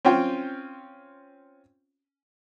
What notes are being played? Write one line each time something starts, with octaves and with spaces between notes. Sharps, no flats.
C4 C#4 F4 G5